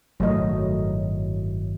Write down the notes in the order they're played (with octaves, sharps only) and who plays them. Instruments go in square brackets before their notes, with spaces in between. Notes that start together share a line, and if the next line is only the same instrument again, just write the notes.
[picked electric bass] G1 A2 D#3 [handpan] F#3 A3 D#5